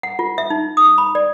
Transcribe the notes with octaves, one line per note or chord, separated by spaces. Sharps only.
F#5
F4
E5
D#4
D#6
B5
D5